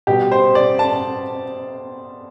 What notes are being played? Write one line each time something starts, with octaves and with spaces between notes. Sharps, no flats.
B2 G3 G4
C5
D5
A5